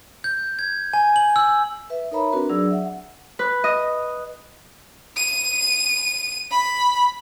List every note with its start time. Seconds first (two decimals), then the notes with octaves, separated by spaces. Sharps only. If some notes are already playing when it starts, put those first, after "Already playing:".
0.24 G6
0.59 G#6
0.93 G#5
1.16 F#7
1.36 E6
1.90 B4 E5
2.12 D#4 A#4 C#5 E5 A#5 B5
2.32 C4 D4 F#4 A#4 B4
2.50 F#3 D4 G#4 D5 E6
2.71 E5 F#5
3.39 B4
3.64 D#5
5.17 D#7
6.51 B5